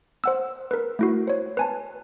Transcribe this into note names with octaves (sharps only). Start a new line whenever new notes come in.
C5 F#5 E6
A#4 B4
A3 E4 F#4
C5 C#5
B4 G#5 A5